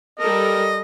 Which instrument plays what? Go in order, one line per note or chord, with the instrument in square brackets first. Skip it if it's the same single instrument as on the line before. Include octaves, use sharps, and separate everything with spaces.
[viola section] G3 A4 A#4 [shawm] D#5